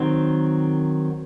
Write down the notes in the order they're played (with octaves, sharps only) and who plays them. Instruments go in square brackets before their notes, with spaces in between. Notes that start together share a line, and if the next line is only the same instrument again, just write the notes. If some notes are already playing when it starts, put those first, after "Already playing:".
Already playing: [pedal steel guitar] D#3 F#3 C4